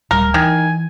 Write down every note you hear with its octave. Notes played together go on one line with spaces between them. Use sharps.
D1 G3 A#4
D#3 E3 G#5